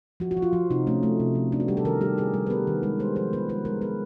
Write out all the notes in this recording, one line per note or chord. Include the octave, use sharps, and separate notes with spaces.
F3 F#4
F#4
F3
F4
F3
C3 D#4
A3 C#4
A3
C3
F3
B3 D4
F#4
G3 G4
A4
D#3 A#4
G3 G4
G3 G#4
G3
B4
B3 A#4
D#3
G#3 B4
G#3 C5
F3 C5
B3 B4
G#3 B4
G#3 A#4
B3 B4